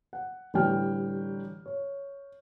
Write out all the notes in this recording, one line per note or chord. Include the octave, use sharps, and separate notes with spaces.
F#5
A1 D3 G3 G5 F6
C#5